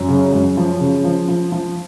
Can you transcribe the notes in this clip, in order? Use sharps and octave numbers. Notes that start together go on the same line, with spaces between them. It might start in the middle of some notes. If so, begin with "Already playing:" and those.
Already playing: F#2
C#3
F#2
F3
C#3
F3
F3
F3